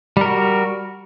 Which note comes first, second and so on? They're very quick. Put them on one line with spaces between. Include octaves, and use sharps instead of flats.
G3 A#4 F#4